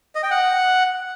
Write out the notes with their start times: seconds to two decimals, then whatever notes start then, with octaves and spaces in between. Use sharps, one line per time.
0.15 D#5
0.23 G5
0.31 F#5